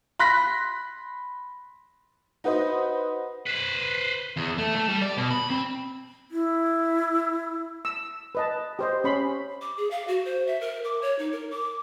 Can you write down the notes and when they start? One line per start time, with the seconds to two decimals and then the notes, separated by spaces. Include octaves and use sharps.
0.19 B5 C6 F#6 A#6 B6
2.44 D#4 F#4 B4 C5 D#5
3.47 B4 C5
4.37 E2
4.58 A3
4.76 A3
4.89 G3
5.02 D5
5.17 B2
5.30 B5
5.50 C4
6.31 E4
7.85 E6
8.35 B4 D#5 A5
8.79 G4 C5 D#5
9.04 C#4 B5 C6
9.61 D6
9.77 G#4
9.91 F5
10.08 F#4
10.25 C5
10.47 E5
10.61 A#4
10.84 D6
11.02 C#5
11.19 D#4
11.33 A#4
11.51 D6